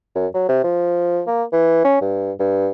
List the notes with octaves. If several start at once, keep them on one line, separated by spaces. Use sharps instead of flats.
F#2
F#3
C3
F3
A#3
E3
C#4
G2
G2